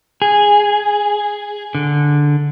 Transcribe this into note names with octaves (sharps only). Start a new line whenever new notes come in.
G#4
D3